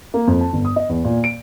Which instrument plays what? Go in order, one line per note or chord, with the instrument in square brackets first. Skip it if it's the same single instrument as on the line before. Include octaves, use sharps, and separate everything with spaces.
[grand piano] A#3
F2
A5
G1
D#6
D#5
E2
A#2
D7